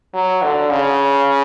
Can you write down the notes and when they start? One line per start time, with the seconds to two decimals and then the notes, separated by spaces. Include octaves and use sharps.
0.14 F#3
0.43 D3
0.70 C#3